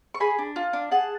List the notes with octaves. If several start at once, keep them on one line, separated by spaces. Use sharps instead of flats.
C#6
G#4 G#5 B5
D4
F4
D4
G#4 F#5 A5